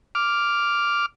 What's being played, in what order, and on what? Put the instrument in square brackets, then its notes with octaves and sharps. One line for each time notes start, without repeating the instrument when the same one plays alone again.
[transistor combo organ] D6 F6